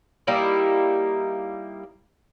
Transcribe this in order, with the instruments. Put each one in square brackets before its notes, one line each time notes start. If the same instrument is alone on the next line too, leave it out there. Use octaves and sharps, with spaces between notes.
[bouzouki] G3 A#3 D#4 E4